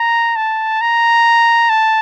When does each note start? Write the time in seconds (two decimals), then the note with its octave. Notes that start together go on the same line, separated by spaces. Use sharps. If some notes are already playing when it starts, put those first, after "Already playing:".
Already playing: A#5
0.36 A5
0.81 A#5
1.69 A5